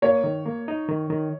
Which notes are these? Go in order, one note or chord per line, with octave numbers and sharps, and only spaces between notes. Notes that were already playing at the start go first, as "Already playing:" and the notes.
A#3 C#5
D#3
A#3
D#4
D#3
D#3